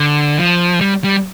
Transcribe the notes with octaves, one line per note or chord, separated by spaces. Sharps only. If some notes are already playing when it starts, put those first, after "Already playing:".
Already playing: D3
F3
G3
G3